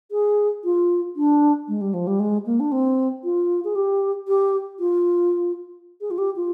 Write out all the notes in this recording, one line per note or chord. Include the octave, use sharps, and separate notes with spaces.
G#4
F4
D4
G#3
G3
F3
G3
G#3
A#3
D4
C4
F4
G#4
G4
G4
F4
G#4
F4
G4
F4